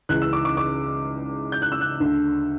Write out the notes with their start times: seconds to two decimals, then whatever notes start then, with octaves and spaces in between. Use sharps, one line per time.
0.09 C#2 C#3 E3 F#6
0.22 E6
0.33 D6
0.45 D6
0.57 D6
1.52 G6
1.62 F#6
1.72 E6
1.81 F#6
2.00 D2 D3